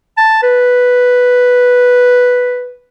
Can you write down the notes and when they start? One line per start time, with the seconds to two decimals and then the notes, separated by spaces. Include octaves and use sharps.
0.17 A5
0.43 B4